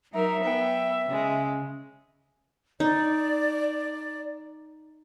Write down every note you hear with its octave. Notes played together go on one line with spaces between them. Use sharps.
F#3 D#4 A#4 E5
B3 G5
C#3 G#3
D#4 D5